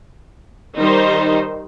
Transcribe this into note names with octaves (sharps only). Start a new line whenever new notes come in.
D#3 G3 D#4 C5